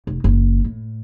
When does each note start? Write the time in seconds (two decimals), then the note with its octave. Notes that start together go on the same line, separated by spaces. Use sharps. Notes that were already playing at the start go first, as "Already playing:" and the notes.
0.07 F1
0.24 F#1
0.65 A2